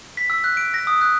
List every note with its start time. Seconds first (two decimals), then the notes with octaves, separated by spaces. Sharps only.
0.17 B6
0.30 E6
0.44 F#6
0.57 D7
0.74 A#6
0.87 D#6
1.01 F#6